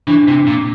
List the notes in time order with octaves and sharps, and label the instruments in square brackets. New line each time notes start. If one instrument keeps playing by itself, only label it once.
[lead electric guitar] E3 [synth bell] D4
[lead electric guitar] C3
A#2